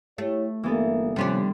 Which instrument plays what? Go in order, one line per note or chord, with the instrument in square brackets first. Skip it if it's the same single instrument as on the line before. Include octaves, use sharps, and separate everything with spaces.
[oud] A3 [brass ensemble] E4 G4 C#5
[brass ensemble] G1 G3 A#3 [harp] E3 B3 A4
[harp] D#2 C6 [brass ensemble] C3 F3 C#4 [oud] G3 B3 D4